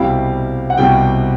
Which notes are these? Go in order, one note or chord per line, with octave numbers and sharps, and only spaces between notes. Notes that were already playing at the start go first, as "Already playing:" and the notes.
Already playing: C2 B2 G3 C4 E4 F5
F#5
C2 B2 G3 C4 E4 G5